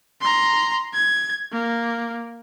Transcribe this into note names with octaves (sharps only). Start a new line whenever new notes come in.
A#5 C6
G#6
A#3